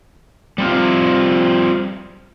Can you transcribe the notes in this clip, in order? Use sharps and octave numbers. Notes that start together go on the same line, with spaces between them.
G3 C4 F4